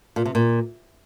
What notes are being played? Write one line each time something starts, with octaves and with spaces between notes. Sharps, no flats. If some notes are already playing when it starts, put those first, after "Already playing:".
A#2
C3
A#2